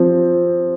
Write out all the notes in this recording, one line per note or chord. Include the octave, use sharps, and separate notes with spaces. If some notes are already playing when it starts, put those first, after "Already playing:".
Already playing: F3 C4